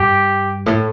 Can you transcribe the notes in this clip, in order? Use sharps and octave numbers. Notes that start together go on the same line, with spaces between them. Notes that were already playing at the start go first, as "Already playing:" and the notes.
Already playing: G2 G4
A2